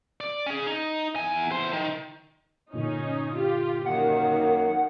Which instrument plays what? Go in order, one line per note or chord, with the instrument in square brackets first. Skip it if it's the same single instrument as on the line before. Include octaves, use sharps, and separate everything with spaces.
[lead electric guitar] D5
C#4 G#4
D#4
E2 G#5
E2 C5
D#3
[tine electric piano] G2 A#2 D3 [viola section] C#4 D#4
[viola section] F4 G4
[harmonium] F#2 A#3 [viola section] D#3 [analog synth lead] F#5